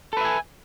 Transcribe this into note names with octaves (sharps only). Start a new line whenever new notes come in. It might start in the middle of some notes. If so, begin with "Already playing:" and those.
A4 B4 E5 G#5